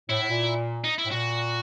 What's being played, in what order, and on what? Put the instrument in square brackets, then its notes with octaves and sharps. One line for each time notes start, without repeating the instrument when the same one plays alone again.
[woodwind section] A2 [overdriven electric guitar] E4
[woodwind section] A2
A#2
[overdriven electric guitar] D#4
E4
[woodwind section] A2
[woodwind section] A#2 [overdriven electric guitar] F#4